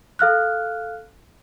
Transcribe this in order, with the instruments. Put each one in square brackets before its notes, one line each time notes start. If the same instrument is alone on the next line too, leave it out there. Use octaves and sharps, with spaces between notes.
[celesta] A4 F5 F6 F#6